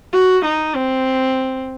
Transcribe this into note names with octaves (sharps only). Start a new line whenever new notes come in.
F#4
D#4
C4